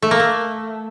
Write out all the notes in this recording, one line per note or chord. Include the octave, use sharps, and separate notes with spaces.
A3
A#3
A3